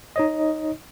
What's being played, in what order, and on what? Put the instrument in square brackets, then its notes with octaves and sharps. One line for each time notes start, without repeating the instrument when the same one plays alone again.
[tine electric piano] D#4 C#5 D#5